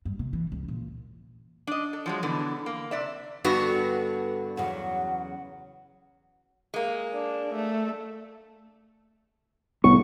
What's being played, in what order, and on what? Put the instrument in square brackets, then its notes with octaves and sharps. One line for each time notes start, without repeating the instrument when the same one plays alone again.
[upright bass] G2
C3
E3
C#2
A#2
[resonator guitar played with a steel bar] D4 D#5
A4
F3 F#3 G#3
B2 D3 E3
A#3
C3 D5 E5
[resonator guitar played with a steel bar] G2 B3 F#4 [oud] D3
[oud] E2 C#3 F#3 [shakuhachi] F#5
[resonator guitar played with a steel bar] G#3 A#3
[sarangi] D4
A3
[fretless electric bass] C2 A2 [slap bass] B3 [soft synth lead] C#6